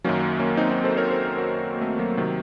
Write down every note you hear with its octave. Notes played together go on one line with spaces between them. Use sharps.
F#2 D#3 F#3 A#3 C#4
A#3 C#4
C4 D#4
C4 D#4
A4 C5
A#4 C#5
A4 C5
F#4 A#4
A#3
A3 C4
F#3 A#3
C3 D#3 F#3